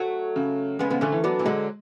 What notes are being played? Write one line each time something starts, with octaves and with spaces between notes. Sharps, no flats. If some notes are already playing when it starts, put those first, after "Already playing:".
Already playing: F#3 A3
C#3
C#3 G#3 B3
C#3 B3
D3 A3 C#4
E3
F#3 B3 D4
E3
D3 F#3 G#3